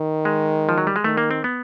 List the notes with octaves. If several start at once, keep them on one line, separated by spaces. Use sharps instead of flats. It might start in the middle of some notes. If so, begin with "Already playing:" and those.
Already playing: D#3
G#3
F3
F#3
G3
G#3
D#3 A3
A#3
C4
B3